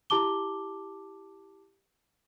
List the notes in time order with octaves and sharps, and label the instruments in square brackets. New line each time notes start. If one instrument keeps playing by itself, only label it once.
[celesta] E4 G4 A5 D6 G7